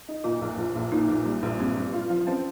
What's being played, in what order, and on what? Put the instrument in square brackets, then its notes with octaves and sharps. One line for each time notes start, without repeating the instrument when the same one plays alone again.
[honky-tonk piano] D#4
[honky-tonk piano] A#2 [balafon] F4
[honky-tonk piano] A#1
A#1
A#1
[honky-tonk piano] A#2 [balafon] D#4
[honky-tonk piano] A#1
G3
A#1
[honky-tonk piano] G2 [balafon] C4
[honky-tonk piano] G2
F4
F3
[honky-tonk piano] C4 [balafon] C#4